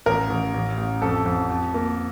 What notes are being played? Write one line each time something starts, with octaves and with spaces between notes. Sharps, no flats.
A1 A#4
A1
A1
A1
F2 A4
F2
F2
A#3